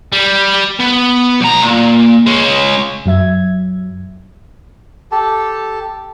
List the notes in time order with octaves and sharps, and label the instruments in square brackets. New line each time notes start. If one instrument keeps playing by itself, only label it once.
[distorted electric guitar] G3
B3
B1 A#5
A#2
G#3 C#4
[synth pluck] F#2 F#3 E5 G#6
[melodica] G4 A4 A5